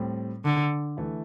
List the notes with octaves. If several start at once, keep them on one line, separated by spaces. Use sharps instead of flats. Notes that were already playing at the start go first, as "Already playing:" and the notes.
Already playing: A2 G3 C4
D3
E3 A3 E4